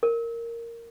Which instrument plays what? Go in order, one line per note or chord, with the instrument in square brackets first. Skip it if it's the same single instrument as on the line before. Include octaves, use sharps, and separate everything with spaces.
[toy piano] A#4